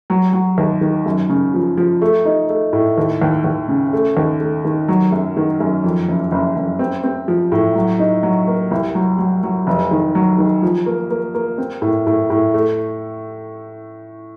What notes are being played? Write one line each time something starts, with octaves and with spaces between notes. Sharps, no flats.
F#3
F#3
D#2
D#3
F#2
C#3
F3
F3
A3
D#4
A3
A2
D#2
D#2
D#2
C#3
A3
D#2
A3
D#3
F#3
F#2
D#3
F#2
F2
F#1
F#1
F#1
C4
C4
F3
A2
F#3
D#4
F#3
A#3
C2
F#3
F#3
F#3
F1
D#3
F#3
D#3
F3
A#3
A#3
A#3
C4
A2
A2
A2
A3